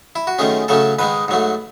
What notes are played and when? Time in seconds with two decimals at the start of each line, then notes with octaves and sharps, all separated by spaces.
0.16 E4
0.27 F#4
0.39 F#2 D#3 A3 C#4 G#4
0.68 C#3 F#3 A3 C#4 A4
0.99 G#2 D#3 G#3 B4
1.28 G#2 F#3 A3